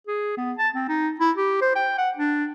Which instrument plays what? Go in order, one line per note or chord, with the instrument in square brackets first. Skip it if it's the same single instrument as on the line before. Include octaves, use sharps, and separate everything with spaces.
[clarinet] G#4
B3
A5
C4
D#4
E4
G4
C5
G5
F#5
D4